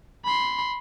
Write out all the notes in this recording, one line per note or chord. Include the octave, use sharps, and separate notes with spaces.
B5 C6